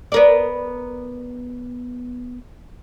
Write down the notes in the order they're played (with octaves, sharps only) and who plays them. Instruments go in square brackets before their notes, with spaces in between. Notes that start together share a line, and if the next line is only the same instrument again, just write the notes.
[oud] B3 A#4 D5